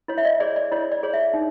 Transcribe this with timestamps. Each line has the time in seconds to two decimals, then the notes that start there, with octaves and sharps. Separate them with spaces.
0.08 E4 C#5
0.18 E5
0.25 D#5
0.40 G#4 C#5 D5
0.56 D5
0.72 E4 C#5
0.92 D5
1.03 G#4 C#5
1.14 E5
1.34 D#4